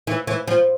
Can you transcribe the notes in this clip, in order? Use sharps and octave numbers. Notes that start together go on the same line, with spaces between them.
E3
E3
F3